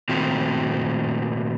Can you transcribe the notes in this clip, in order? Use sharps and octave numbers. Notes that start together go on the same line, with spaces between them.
A#2 D#3 A3 C4 F4 F#4